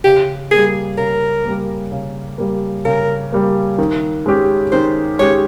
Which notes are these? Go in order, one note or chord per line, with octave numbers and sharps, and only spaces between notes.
C#3 G4
G3 A#3 G#4
C#3 A#4
G3 A#3
C#3
G3 A#3
C#3 A#4
G3 A#3
D#3
G#3 C#4 G4
D#3 C5
G#3 C#4 G4 C#5